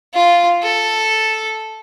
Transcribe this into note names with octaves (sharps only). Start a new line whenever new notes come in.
F4
A4